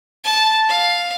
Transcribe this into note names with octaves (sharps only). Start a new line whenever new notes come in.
A5
F5